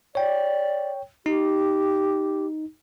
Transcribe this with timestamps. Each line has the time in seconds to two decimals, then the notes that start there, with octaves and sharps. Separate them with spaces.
0.15 C#5 D5 G5
1.26 D#4 G4